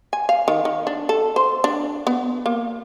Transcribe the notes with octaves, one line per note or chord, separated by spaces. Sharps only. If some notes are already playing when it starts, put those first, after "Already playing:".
G#5
F5
D#3
D#3
D4
A4
C5
D4
B3
A#3